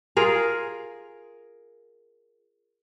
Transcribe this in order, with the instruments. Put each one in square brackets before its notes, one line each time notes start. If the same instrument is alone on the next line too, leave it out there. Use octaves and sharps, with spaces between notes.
[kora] F4 G#4 A#4